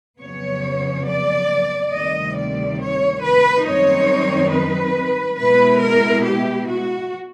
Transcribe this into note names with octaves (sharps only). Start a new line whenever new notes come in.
F2 C#3 F#3 B3 C#5
D5
D2 C3 D#3 G3 D#5
D5
C#5
B4
F#2 D#3 G3 C4 D#4 C#5
B4
B2 G#3 B3 E4 B4
A#4
G4
F#4